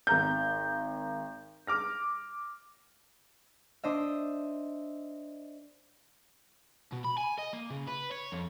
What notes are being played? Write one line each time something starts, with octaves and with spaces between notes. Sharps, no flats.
G#1 A#5 G6
D6 F6 A#6
D4 C5 D#5 E5
B2
B5
G#5
D#5
A#3
C#3
B4
C#5
F2